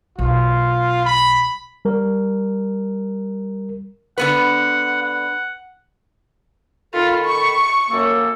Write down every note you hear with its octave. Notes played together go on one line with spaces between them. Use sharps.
B1 F4
B5
G3 A#4
D3 B3 B4 F#5
F#5
D#3 F4 A4 B5
C#6
F#2 A#3 A4